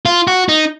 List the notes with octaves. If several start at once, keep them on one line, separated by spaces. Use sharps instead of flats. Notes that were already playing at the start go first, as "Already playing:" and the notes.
F4
F#4
D#4